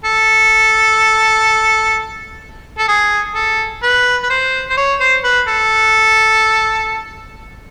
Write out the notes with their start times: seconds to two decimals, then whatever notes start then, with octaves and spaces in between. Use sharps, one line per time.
0.05 A4
2.78 A4
2.88 G#4
3.35 A4
3.83 B4
4.23 B4
4.30 C5
4.70 C5
4.77 C#5
5.00 C5
5.24 B4
5.48 A4